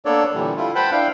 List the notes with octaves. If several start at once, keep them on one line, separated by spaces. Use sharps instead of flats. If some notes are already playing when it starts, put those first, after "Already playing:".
A#3 B3 D4 A4 C#5 D5
A#2 D3 E3 G3
G3 A3 E4 F4
B4 C5 F#5 G5 A5 B5
D4 E4 F5 G5